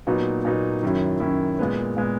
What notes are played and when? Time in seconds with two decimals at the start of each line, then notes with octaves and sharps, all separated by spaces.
0.07 A#2 F#3 B3 D#4 F#4
0.45 A#2 F#3 B3 D#4 F#4
0.83 F#2 D#3 F#3 C#4 E4
1.20 F#2 D#3 F#3 C#4 E4
1.59 A#2 G#3 B3
1.97 A#2 G#3 B3